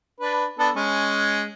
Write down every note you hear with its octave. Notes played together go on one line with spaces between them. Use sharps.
D4 B4
B3 D4 A4
G#3 C#4